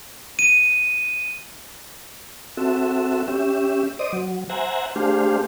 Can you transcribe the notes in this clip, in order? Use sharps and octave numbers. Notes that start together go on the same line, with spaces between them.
D#7
C4 F#4 A4 E5
C#4 G4 E5
C5 D5 D#5 D#6
F#3
C5 E5 F#5 G#5 A#5
A3 D4 G4 G#4 C5 F5